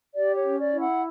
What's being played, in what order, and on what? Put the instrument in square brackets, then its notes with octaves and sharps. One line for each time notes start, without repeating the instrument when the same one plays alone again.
[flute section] G4 D5
C#5
C#4
D5
E4
F#5